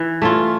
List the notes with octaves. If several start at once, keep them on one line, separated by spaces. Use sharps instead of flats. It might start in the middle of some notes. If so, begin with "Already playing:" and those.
Already playing: E3
A3 C#4 F4